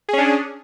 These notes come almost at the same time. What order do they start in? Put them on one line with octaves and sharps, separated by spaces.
G#4 C#4 D4